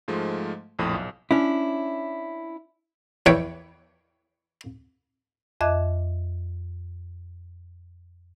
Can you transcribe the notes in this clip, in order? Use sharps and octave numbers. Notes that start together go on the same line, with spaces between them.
G#2 F3 G#3 A3
A#1 F2 A2 D#6
B1
C#4 D4 E4
E2 B4 C#5 G5
F2 D#5 E5 D6 F#6 G#6